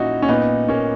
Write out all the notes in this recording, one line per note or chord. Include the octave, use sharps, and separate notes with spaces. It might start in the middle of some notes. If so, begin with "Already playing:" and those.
Already playing: A#2 C#4 D#4 E4 F#4
C#4
A#2 B3 D#4
A#3 C#4